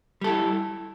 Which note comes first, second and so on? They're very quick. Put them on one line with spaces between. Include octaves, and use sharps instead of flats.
G3 A4 E4